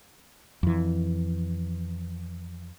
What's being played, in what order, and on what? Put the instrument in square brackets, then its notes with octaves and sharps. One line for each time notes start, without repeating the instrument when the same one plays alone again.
[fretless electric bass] F2 E3